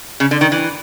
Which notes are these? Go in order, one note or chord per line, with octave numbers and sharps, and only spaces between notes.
C#3
D3
D#3
E3